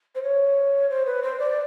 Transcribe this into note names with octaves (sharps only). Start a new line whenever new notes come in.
C5
C#5
C5
B4
C5
D5